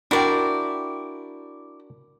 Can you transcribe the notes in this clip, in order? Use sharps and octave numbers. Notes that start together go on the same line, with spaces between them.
D4 E4 F#4 A#4 D5 G5